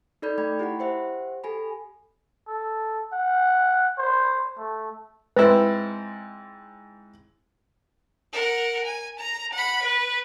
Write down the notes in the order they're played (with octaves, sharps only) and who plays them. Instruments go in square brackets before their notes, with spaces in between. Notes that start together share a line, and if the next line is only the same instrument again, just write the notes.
[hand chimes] D#4 A4 D5 B5 G6
A3 G5 B5 G#6
E4 G4 F#5 B5
G4 C5 E5 F#5
G4 A4 G#5 B5
[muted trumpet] A4
F#5
C5
A3
[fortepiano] G#2 C4 E4 [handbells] B4
[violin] A#4 F#5
G#5
A#5
F#5 B5
B4